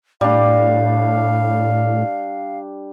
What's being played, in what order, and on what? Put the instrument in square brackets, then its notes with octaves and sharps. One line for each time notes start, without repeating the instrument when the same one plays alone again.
[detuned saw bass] A2 [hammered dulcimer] G3 D4 [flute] F5